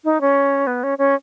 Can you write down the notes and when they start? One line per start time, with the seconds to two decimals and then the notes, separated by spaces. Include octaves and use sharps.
0.05 D#4
0.21 C#4
0.67 B3
0.83 C#4
0.98 C#4